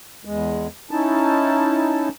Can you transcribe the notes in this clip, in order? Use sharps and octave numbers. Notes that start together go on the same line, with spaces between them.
E2 G#3
C#4 D#4 E4 A5